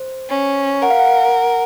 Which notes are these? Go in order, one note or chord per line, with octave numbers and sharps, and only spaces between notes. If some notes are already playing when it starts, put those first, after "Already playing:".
Already playing: C5
C#4
A#4 F#5
F5
F#5